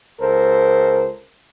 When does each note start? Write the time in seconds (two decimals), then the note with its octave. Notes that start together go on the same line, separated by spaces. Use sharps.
0.21 C#2 A4 A#4 C5